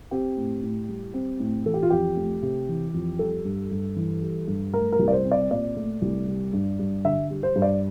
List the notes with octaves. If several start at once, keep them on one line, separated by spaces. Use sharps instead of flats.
C4 G4
A2
A2
G3
C4
A2
E3 A4
G4
F4
F2 G4
A3
C3
E3
F2
G3 A4
G2
G2
E3
G3
G2
A3 A#4
A#4
C2
D5
C5
C4
D5
A#2 D5
A3
C2
G3
G2
G2
D3 E5
G3
C5
G2
D5